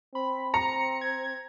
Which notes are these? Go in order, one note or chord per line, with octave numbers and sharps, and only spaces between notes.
C4 B5
A#5 C#7
G#6